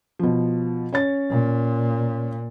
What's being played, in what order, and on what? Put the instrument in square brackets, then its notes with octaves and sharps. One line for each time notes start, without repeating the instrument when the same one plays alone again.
[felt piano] B2 F3
C#4 C#5 A6
[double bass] A#2